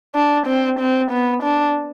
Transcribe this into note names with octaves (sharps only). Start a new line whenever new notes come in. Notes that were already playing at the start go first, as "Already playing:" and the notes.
D4
C4
C4
B3
D4